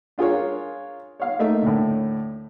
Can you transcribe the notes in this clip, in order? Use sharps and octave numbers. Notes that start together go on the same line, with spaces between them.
D4 F4 G#4 A#4 C#5
C#5 F5
A3 A#3 D#4 A#4 E5
D2 A2